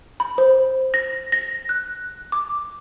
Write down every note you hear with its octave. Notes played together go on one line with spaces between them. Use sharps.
B5
C5
A#6
A#6
F#6
D6